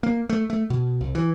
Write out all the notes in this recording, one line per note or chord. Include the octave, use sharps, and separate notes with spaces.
A#3
A3
A3
B2
C2
E3